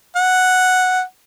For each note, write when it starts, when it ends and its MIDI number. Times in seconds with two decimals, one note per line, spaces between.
0.16 1.01 78